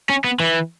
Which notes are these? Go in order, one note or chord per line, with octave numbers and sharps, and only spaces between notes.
C#4
B3
E3